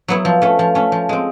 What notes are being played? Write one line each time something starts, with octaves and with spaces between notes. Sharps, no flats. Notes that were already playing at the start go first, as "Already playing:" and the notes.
F#3 B3 E4
F3
A3 C#4
F3
A3 C#4
F3
G#3 C4